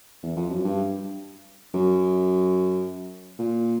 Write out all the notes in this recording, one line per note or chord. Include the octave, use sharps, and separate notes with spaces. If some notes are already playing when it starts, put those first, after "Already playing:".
E2
F2
F#2
G2
F#2
A#2